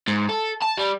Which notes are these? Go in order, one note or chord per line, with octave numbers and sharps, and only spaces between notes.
G#2
A4
A5
G3